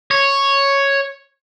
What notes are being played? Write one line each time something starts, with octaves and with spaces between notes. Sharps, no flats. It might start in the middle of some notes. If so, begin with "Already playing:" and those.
C#5